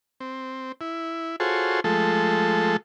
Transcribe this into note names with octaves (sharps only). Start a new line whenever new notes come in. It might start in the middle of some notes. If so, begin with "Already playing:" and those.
C4
E4
F4 F#4 G#4 A4 C5 C#5
F3 G#3 A3 A4